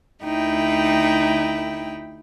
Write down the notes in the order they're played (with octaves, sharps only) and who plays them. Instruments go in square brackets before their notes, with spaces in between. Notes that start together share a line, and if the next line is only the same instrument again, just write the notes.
[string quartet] D2 D#4 E4 G5